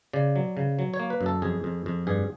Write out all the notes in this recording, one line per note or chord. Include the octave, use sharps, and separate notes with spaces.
C#3 D5
F#3
C#3
F#3
C#5
A#3
B4
F#2
A4
F2 G#4
F2
F2
G2 G#4